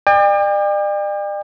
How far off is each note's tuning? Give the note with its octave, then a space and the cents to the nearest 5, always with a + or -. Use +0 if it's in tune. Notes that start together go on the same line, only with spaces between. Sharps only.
D5 +40 G5 +40